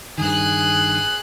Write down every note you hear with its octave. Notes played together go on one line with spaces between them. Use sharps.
G2 D#3 G#4 F#6